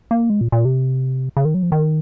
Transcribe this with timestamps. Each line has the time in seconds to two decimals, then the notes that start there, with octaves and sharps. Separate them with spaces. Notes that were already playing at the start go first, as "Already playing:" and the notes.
0.11 A#3
0.30 G#3
0.41 A#2
0.52 A#2
0.65 C3
1.37 C#3
1.45 D#3
1.54 F#3
1.63 F3
1.72 D#3